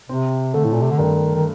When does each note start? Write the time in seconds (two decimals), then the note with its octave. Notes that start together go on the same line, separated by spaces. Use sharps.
0.09 C3 C4
0.54 D3 A3
0.64 A2
0.73 A#2
0.81 C3
0.91 D3
0.99 G2 D#3
1.35 D#3